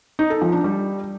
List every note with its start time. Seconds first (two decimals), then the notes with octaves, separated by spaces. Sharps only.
0.19 D#4
0.30 A4
0.41 F3
0.53 D4
0.64 G3